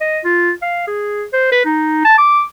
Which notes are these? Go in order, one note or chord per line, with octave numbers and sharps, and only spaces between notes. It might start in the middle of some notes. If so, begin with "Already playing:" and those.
D#5
F4
F5
G#4
C5
B4
D#4
A5
D6